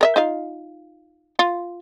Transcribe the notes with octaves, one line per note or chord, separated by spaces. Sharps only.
A#4 D#5 E5
D#4 F4 F5
F4